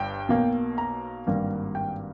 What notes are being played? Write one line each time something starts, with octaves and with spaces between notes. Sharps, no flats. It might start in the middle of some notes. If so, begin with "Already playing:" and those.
Already playing: G1 G2 G5
B1 B2 A#3
A#5
G#1 G2 G3 A#3
G5